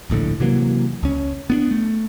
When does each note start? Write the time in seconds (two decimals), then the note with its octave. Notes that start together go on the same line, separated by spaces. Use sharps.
0.10 D1 A#1 A2 D3
0.40 C3 E3 F#3 A#3
1.03 C#2 C#4
1.50 B3 C#4 D4
1.71 A3